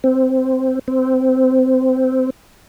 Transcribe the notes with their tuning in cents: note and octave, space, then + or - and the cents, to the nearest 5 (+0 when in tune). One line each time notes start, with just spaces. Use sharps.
C4 -5
C4 -15